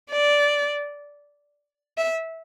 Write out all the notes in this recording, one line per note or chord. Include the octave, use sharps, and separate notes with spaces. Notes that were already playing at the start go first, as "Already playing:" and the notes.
D5
E5